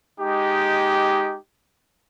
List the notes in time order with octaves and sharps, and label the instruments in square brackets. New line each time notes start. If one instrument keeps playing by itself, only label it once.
[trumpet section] G#3 D#4 G4